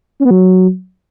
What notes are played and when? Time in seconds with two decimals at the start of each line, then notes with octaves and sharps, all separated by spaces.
0.20 C#4
0.25 B3
0.31 F#3